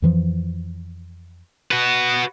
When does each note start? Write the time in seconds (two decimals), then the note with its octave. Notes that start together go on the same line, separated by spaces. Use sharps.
0.02 F2 E3 F3
1.71 F#4 B4